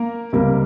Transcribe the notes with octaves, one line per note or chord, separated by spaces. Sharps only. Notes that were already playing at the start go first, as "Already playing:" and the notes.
Already playing: A#3 A#4
C#2 C3 G3 A#3